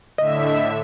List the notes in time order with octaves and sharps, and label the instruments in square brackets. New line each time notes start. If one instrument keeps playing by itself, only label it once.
[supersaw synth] A2 D3 E5 [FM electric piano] D#5